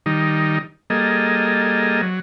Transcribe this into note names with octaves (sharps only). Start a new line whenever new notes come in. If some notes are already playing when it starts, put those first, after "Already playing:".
D#3 G3 D#4
G3 A#3 G#4 A4 D#5
F#3